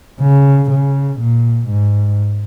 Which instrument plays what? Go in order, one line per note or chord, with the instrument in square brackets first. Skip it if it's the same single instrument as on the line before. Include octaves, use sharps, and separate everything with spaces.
[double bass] C#3
C#3
A#2
G#2